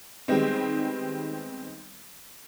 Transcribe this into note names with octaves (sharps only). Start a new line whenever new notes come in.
D#3 G3 G#3 B3 C4